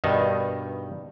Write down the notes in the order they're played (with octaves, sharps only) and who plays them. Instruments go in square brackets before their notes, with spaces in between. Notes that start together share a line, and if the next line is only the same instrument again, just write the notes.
[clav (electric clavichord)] G2 B2 D#3 D#4